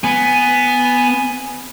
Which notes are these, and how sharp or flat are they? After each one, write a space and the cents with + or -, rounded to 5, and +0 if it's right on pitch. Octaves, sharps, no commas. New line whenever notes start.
B3 +5 G#5 +0